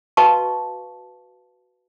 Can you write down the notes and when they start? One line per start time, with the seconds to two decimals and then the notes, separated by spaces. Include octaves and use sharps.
0.17 F#4 B4 D#5 F5 A5 C#6